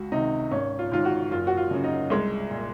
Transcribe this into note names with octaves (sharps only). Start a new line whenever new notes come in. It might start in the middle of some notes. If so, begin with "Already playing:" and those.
Already playing: C#2 F#4
C3 D#3 D#4
G#1 C#4
F4
G#2 D#3 F4
F#4
F#1 F4
F#4
F4
F#2 C#3
D#4
C2 G#3
A#2